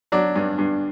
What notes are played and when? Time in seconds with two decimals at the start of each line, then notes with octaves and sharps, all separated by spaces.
0.12 F#3 D4
0.35 G2
0.58 G2